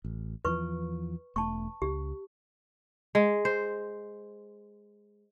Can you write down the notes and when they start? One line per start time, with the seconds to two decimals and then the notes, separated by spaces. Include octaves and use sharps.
0.04 A1
0.45 E2 E3 F3 B4 C#6
1.36 E1 A3 A5 C#6
1.82 C#2 G4
3.15 G#3
3.45 C5